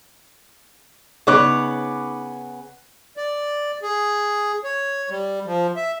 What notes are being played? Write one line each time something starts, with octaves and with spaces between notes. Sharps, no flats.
C#3 B3 D#4 C#5 D6 F#6
D5
G#4
C#5
G3
F3
E5